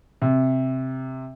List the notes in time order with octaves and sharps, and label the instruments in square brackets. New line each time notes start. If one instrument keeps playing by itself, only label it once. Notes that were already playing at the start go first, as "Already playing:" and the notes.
[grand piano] C3